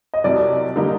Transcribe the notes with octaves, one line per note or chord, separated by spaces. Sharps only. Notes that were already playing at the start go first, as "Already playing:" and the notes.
D#5
C2 C3 F#3 D5
D3 G3 A#3 D#4